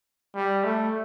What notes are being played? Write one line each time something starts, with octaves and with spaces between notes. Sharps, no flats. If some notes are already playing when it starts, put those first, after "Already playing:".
G3
A3